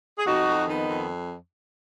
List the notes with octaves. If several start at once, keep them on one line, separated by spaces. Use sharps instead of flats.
G#4
F2 D#4 F#4
F2
D#3 B3 D#4
F2